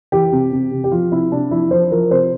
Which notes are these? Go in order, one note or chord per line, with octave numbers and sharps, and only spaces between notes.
E3 G4
C3
C3
C3
G4
F3 F4
C3 E4
C3 D4
F3 E4
F3 C5
F3 A#4
C3 C5